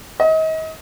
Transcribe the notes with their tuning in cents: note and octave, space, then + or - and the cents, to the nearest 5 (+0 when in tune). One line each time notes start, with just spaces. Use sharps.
D#5 +35